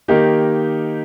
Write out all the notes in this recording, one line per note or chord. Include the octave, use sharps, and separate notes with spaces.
D#3 A#3 D#4 G4